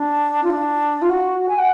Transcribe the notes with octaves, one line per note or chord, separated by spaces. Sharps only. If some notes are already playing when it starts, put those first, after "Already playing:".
Already playing: D4
F4
D4
F4
F#4
G#5
F#5